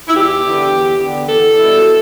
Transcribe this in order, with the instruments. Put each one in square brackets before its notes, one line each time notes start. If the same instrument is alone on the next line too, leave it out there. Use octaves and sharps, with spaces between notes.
[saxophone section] E4
E2 G4
D3 B3
E2
D3 B3
E2 A4
B2 G3 E4